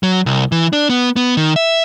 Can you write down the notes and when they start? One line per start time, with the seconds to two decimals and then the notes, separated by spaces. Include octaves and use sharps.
0.03 F#3
0.26 C2
0.52 E3
0.73 D4
0.89 B3
1.16 B3
1.37 D#3
1.56 E5